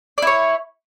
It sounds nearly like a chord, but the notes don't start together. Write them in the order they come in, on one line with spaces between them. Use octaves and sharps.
D5 E4 C#5